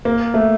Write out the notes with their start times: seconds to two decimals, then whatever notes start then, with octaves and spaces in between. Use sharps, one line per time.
0.05 A#3
0.34 A3